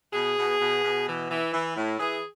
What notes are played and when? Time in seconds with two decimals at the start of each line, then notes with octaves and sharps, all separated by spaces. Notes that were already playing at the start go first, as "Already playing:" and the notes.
0.13 B2 G#4
0.37 B2
0.59 B2
0.83 B2
1.06 E3
1.30 E3
1.53 E3
1.76 A2
1.99 E3 G#4